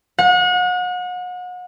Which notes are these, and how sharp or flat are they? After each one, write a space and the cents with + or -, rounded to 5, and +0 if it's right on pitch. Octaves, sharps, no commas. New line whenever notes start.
F#5 -35